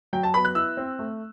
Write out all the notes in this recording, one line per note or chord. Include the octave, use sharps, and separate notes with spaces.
F#3 G5
A5
B3 B5
F#6
E4 E6
C4
A3